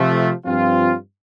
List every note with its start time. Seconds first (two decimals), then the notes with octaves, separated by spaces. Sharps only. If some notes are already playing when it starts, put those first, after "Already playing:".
Already playing: C3 F3 A3
0.45 G2 F3 C4 F4